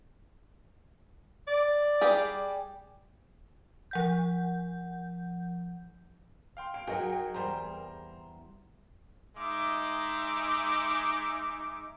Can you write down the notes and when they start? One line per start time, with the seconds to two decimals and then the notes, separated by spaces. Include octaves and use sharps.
1.47 D5
2.01 G3 G4 G#4
3.91 F3 F#5 G6
6.57 F5 G5 C6
6.74 F5 D7
6.87 F#3 D#4 F#4 G#4 A#4 D#5 F#5 G5
7.34 E2 G3 C5 A#5
9.36 G#3 D#4 E5 D6